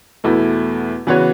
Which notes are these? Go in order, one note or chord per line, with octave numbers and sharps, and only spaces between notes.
E2 B2 A3 E4
C#3 E3 B3 F#4 C#5